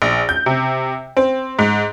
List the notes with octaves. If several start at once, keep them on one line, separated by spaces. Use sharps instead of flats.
A#1
G6
C3
C4
G#2